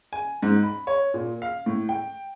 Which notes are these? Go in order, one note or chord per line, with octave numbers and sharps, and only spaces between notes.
G#5
G#2
B5
C#5
A#2
F5
A2
G5